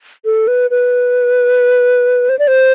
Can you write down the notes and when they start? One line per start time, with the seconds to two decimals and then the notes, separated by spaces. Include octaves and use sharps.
0.25 A4
0.48 B4
0.71 B4
2.29 C5
2.39 D5
2.48 C5